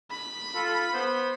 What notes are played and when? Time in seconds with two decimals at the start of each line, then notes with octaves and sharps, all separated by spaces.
0.11 B5
0.55 F4 A4
0.94 B3 C5